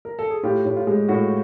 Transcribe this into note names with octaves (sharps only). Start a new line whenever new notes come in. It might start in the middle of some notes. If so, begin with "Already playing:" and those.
A#4
A4
G#4
A2 F4 G4
A2
F4
G#3
A2 F#4